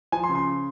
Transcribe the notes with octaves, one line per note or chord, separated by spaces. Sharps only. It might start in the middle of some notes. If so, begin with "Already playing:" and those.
F3 G#5
C6
C#3
C6